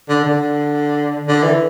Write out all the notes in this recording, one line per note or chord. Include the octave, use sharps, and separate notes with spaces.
D3
D3
D3
E3